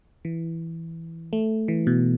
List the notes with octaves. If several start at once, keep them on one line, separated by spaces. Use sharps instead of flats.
E3
A3
E3
B2